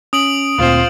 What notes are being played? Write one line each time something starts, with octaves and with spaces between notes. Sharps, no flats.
C#4 D#6 D7 F#7
D2 A#2 C4 F4 C5